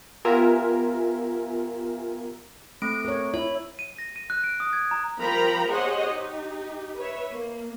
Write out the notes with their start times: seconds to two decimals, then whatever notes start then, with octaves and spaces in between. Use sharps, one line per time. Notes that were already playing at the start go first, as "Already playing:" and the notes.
0.25 B3 F4 G4 A#4 E5 G#5
2.82 A3 C4 D7
3.05 A#4 C#5
3.34 E4 C#5
3.79 D#7
3.98 A#6
4.16 D#7
4.30 F#6
4.44 D7
4.60 D#6
4.73 G#6
4.91 A#5
5.20 F3 G3 A#4 G5 A#5 B5
5.69 G4 G#4 C5 C#5 D#5 F#5
6.10 D#4 G4
6.97 B4 C#5 E5
7.31 A#3